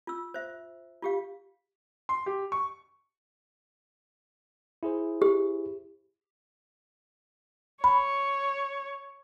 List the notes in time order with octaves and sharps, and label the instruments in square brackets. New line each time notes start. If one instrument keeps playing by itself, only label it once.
[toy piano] F4 E6
C5 E5
F4 G4 F5
[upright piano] C6
G4
C#6
[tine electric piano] E4 G#4 C5
[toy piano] G4
[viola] C#5 [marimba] B5